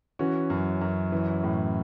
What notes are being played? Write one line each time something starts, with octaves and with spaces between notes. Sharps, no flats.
E3 C#4 F#4
F#2
F#2
E3
A2